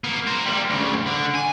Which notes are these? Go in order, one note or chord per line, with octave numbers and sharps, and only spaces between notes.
A#3 B3
A#4 C5
G3 A#3
D2 C#3
D3
G#5